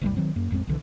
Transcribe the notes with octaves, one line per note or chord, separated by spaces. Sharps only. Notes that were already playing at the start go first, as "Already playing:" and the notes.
F#1 C2 A2 G3
D#3 F#3 C4
F#2 A#3
A1 F2 G#3 C4
B1 D3 E3